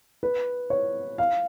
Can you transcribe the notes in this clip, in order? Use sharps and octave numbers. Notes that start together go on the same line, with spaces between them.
B4
C#5
F5